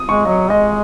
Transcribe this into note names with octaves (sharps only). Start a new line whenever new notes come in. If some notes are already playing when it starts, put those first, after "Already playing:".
Already playing: D#6
G#3 C#6
F#3 D#5
G#3 D#5